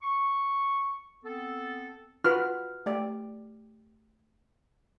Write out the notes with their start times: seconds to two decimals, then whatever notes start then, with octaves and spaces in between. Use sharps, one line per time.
0.01 C#6
1.24 B3 C4 A4
2.24 F4 F#4 B4 F6
2.86 A3 G4 D5